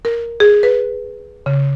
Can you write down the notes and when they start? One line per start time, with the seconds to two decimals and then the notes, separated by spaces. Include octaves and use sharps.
0.05 A#4
0.40 G#4
0.63 B4
1.46 C#3